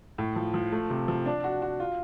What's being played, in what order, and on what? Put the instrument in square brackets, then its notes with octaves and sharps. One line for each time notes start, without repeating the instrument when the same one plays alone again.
[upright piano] A2
F3
F3
A3
C3
F3
D4
F#4
F#4
F4